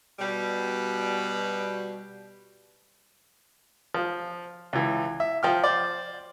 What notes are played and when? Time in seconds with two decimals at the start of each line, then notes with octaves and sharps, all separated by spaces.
0.19 B2 G3
3.94 F3
4.73 C#2 E3
5.20 E5
5.43 F3 G5 F6
5.64 C5 D5